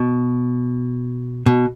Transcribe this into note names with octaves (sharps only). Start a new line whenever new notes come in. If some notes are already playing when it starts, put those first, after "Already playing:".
Already playing: B2
B2